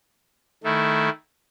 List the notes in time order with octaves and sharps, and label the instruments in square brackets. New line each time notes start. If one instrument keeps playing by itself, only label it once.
[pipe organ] D#3 A3 E4